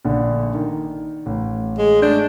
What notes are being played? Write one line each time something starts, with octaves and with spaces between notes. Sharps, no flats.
A#1 D3
D#3
A1
G#3
A3 D4 G6